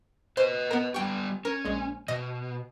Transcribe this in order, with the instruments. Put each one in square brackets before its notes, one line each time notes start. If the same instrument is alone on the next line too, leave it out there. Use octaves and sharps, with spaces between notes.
[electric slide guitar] B4 D#5 [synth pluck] C5
[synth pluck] B3 A#4
[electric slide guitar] G3 B3 G4 [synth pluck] G5 C#6
[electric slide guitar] C#4 [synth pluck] A#4
[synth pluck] A#1 G#3
[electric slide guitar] B2 [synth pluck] D#5